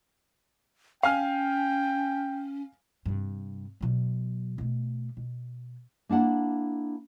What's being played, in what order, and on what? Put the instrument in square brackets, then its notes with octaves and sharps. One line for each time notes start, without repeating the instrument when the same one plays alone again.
[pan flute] C#4 [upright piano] F5 G#5 F6 [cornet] G5
[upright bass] G2 C3
B2 F#3
B2 A3
B2
[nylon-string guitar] A#3 D4 E4 F#5 A5